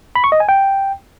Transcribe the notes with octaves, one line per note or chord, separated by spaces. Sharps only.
B5
C#6
D#5
G#5
G5